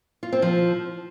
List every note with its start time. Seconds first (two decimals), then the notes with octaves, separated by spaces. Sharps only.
0.23 F4
0.32 C4
0.42 F3